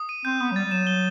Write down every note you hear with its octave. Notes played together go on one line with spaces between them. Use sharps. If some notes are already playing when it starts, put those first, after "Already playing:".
Already playing: D#6
D#7
C4 G6
B3 D#6
F#3
G3 A6
G3
F#3 E7
G7